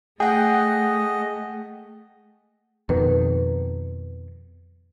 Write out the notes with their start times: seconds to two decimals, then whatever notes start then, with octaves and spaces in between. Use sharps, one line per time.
0.20 A3 G#4 D#5 F#5 G5
2.89 F2 B2 D#3 B4